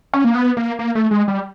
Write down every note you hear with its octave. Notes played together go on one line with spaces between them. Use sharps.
C#4
A#3
B3
A#3
A#3
A3
G#3
G3